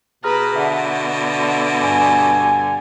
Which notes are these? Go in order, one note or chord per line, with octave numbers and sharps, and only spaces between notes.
B2 G#4 B4 A#5 F6
D3 E5 F#5 A5
G2 G#5